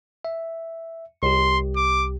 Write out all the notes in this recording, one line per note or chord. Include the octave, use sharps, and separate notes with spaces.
E5
C2 G4 C6
D6